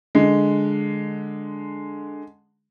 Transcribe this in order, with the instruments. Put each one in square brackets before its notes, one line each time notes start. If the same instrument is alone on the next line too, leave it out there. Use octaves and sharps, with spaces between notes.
[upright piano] D3 G#3